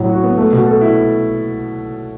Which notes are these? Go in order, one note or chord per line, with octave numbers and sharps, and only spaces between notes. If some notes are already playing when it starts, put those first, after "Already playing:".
Already playing: A2 F#3
F#4
B3
A3
B2
A4
E4